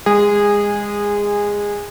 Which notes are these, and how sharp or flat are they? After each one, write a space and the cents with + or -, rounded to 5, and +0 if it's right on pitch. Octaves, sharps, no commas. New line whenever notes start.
G#3 -15 G#4 -20